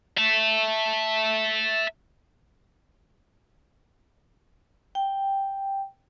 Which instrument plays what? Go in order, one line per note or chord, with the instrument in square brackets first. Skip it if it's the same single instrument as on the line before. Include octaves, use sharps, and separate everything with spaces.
[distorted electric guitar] E5 A5
[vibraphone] G5